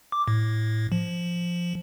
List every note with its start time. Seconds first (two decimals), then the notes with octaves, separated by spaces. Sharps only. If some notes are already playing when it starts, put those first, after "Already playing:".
0.12 D6
0.28 A2
0.92 F3